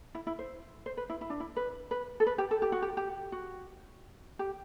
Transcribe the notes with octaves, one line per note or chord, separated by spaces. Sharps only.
E4
E4
C5
C5
B4
E4
E4
D4
E4
B4
B4
A4
B4
G4
A4
G4
F#4
G4
G4
F#4
G4